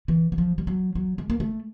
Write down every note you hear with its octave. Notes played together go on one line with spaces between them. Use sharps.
E3
F#3
F3
G3
F#3
F#3
G#3
A#3
A3